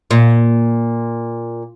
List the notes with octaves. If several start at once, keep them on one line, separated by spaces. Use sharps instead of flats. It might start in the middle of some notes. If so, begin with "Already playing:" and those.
A#2